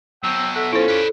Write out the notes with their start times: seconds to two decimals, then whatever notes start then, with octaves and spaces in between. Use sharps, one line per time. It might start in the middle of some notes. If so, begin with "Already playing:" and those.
0.24 B2 F#3 G5 E6
0.56 A4 E5 F#5
0.73 C#4 E4 F4 A4 C5
0.88 B4 D5